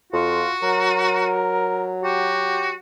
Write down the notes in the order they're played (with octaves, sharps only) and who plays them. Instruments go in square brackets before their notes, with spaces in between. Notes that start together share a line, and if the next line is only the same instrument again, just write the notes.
[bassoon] F2 [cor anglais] F4 [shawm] F#4
[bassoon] F#3 [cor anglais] A#4
[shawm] F#4 [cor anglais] G4